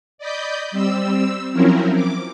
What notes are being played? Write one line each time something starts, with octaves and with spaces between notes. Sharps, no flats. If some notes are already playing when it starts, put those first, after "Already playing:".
D5 D#5 B5 G6
G3 C4 E6
F3 F#3 C4 C#4 E4 A#4
D6